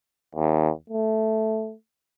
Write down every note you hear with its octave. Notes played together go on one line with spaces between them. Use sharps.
D#2
A3